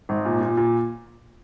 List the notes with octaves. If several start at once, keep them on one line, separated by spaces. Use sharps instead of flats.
G#1
A#2
A#2
A#2